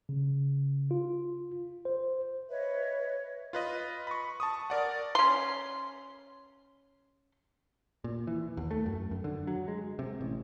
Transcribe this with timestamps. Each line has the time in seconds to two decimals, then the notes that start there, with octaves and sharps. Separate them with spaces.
0.09 C#3
0.91 F4
1.85 C5
2.50 B4 C#5 D#5 E5
3.53 F4 B4 D#5
4.07 B5 C#6
4.40 A5 C#6 D#6
4.70 A#4 D5 F#5
5.15 C#4 C6
8.04 A#2
8.27 E3
8.57 D#2
8.71 A3
8.86 F#2
9.11 F#2
9.24 D3
9.47 F#3
9.68 G#3
9.99 C3
10.21 A1